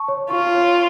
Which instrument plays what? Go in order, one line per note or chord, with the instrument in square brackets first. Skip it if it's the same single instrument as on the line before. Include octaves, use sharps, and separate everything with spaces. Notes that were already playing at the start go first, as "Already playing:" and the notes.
Already playing: [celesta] A5 C#6
C#5
[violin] F4 [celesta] C#6
[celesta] C#5